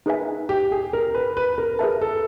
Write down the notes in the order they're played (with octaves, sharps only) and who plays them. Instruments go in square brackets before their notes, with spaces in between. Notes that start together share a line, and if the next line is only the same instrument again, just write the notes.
[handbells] D#4 G#4 B4 E5 G#5
[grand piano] G4
G#4
A#4
B4
B4
A#4
[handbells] G#4 B4 E5 A5 [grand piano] A#4
[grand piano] A4